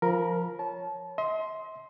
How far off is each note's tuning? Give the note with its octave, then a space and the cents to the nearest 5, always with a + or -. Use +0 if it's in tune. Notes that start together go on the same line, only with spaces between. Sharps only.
F3 +0 A#4 +0 B5 -30
C#5 -5 A5 -20
D#5 +45 C6 +0